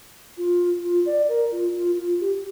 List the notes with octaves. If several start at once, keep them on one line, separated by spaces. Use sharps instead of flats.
F4
F4
D5
A#4
F4
F4
F4
G4